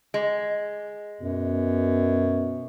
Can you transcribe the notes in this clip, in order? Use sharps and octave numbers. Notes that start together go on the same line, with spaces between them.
G#3
F#2 B2